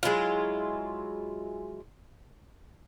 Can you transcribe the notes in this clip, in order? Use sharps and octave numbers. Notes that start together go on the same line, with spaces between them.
F#3 G#3 E4 F4